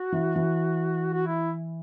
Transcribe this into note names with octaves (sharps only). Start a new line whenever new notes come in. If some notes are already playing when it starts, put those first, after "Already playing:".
Already playing: F#4
E3
E3
F#4
E4